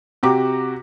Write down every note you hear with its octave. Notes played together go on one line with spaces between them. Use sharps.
C3 F#4 G4 A#5 D6